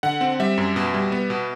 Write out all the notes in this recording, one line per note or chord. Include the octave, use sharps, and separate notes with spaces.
D3 F#5
C4
G3 E5
F#2
B2
G3
B3
B2